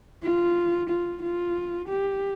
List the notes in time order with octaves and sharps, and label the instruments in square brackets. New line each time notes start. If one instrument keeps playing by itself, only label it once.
[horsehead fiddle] F4
F4
F4
G4